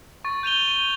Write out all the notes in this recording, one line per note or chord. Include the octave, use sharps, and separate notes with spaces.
C#6 A6
G6 D#7 F7 G7
D#7